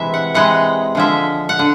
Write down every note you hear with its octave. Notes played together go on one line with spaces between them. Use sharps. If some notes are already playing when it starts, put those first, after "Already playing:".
Already playing: C3 E3 G#3 E5
F#5
C3 E3 G#3 F#5
D3 F3 G#3 E5
F#5
D3